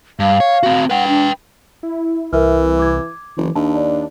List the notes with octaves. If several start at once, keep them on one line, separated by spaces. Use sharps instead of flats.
G2 F5
C#5
C4 F#4
B4 F#5 G5
D4
E4
C2 E3 A#4 E5 F6
D6 G#6
F#1 E3
D#2 D4 A5
D5